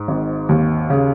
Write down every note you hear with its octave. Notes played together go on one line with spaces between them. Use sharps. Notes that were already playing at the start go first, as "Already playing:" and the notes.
Already playing: G#2
G#1
D#2
C#3